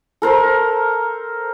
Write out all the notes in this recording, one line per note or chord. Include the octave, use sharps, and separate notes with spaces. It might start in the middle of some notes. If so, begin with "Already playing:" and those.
A4 A#4 C5